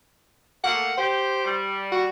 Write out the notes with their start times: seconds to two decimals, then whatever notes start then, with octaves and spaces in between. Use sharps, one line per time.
0.64 A3 A#3 F#5
0.98 G4 C5
1.44 G3
1.92 F#4